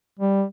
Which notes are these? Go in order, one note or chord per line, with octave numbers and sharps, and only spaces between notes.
G3